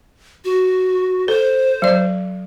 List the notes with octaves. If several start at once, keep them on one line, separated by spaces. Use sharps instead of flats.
F#4
A4 C5
F#3 D5